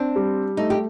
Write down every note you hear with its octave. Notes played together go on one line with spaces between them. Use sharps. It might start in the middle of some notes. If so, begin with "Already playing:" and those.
Already playing: C4 D4
G3
A3 D#4
G4